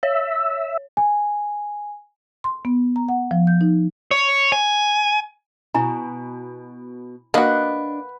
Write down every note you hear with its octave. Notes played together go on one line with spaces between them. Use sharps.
C#5 E5
G#5
C6
B3
A#5
F#5
F3
G6
D#4
C#5
G#5
B2 E4 G#5 A#5
A#3 D4 F#4 B4 D#5 F#5